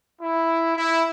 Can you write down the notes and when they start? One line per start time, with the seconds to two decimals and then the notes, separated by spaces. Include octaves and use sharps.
0.21 E4
0.75 E4